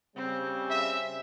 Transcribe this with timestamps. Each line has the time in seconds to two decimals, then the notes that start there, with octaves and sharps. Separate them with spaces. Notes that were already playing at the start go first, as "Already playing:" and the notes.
0.16 C#3 G3 C4
0.70 E5